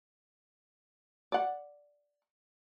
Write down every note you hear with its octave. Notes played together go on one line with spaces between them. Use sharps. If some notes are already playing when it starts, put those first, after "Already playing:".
D5 F#5